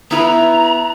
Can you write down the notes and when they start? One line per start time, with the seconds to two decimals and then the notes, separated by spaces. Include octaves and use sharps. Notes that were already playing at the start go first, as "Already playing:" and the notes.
0.11 B3 E4 B4 A#5